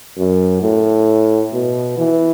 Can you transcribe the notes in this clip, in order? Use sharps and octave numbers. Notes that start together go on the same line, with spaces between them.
F#2
A2
B2
E3